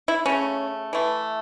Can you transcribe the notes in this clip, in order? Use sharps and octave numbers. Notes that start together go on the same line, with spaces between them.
E4
C#3 A3 C#4
E3 A3